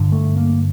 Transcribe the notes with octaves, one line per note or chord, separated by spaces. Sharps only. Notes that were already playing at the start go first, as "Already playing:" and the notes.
Already playing: G2 D3
A3
A#3